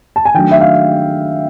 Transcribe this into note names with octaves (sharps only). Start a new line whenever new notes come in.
A5
G#5
D#3 F#3 A3 D4 G5
E5
F5